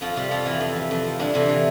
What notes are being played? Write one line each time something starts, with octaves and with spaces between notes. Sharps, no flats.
F2 F3 F4
C3 G3 G4
F2 F3 F4
E3 F3 E4
F2
C3
F2
F3
G2 D3 D4
C3 E3 C4
E3